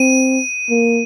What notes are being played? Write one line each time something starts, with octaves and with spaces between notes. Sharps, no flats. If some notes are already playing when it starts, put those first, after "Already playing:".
Already playing: C4 D#7
A#3